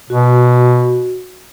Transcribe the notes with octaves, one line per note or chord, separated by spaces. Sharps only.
B2 F#4